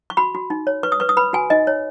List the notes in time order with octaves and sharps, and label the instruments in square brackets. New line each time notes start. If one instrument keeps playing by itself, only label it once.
[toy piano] C#6
F#4 B5
F#4
D#4
C#5
B4 C#6
D#6
B4 C#6
D#6
B4 B5
F#4 G#5
D#4 D#5
C#5